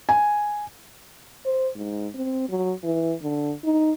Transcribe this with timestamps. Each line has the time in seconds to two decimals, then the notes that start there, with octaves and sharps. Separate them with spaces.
0.09 G#5
1.45 C5
1.75 G#2
2.14 C4
2.49 F#3
2.83 E3
3.22 D3
3.64 D#4